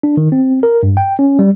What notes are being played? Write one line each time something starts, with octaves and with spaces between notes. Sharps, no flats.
D4
D#3
C4
A#4
G2
G5
C#4
G3